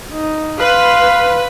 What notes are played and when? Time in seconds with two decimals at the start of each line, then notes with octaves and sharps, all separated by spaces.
0.12 D#4
0.60 B4 F5 C6